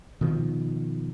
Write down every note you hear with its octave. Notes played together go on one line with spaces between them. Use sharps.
B2 D#3 F3